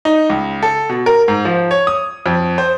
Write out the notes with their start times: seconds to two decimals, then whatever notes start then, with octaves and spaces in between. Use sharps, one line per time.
0.05 D#4
0.30 C#2
0.63 A4
0.89 B2
1.06 A#4
1.28 G#2
1.45 F3
1.71 C#5
1.87 D#6
2.26 F2
2.58 C5